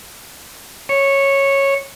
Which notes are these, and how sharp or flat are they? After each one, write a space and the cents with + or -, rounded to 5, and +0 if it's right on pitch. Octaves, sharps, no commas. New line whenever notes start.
C#5 -10